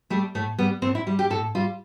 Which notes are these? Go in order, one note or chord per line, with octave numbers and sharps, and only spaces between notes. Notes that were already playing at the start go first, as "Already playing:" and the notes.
G3 A3
A2 A3
G3 B3
A2 C4
E4
G3
G4
A2 A4
G3 F4